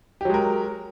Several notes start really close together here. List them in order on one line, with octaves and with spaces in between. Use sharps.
G4 F#3 G#3 A#4